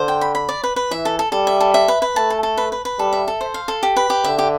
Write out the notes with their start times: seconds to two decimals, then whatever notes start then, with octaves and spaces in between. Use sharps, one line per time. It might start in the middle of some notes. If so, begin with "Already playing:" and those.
Already playing: D3 C5
0.08 G5
0.21 B5
0.35 B5
0.49 D5
0.63 B4
0.76 B4
0.91 E3 E5
1.05 A4
1.19 A4
1.32 G3 A4
1.47 E5
1.60 A4
1.74 E5
1.88 B4
2.02 B4
2.16 A3 A5
2.30 A4
2.43 A4
2.58 B4
2.72 B4
2.85 B4
2.99 G3 A4
3.13 E5
3.28 A4
3.41 C5
3.54 F5
3.68 A4
3.83 G4
3.96 B4
4.10 G4
4.24 D3 E5
4.39 G4